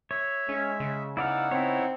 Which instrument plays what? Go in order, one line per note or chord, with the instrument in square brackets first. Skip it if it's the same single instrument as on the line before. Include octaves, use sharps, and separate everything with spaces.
[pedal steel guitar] C#5 [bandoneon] E5
[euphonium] G#3 [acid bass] C#4
[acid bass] C#3
[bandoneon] B3 D#4 F#5 [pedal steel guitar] E4 D5 F5
[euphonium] C4 [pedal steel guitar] E4 C#5